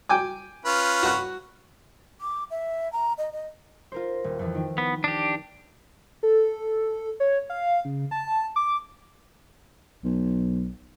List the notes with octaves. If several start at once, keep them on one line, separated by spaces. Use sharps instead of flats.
G5 G#5 D6
C#4 F4 B4
F#4 F#6
D6
E5
A#5
D#5
D#5
F4 A#4 C5
D#1
F2 E3
D#3
B3
D4 G4
A4
C#5
F5
C#3
A5
D6
B1